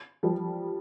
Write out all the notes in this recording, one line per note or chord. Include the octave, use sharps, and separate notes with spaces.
F3 G3